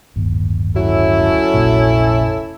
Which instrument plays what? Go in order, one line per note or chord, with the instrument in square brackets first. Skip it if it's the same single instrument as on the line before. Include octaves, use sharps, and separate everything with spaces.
[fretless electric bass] D1 G1 D#2
[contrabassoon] F#3 [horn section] C#4 E4 A4
[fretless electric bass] F1 A#1 A#2